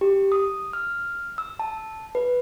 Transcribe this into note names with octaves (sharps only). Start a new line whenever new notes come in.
G4
D#6
F6
E6
A5
B4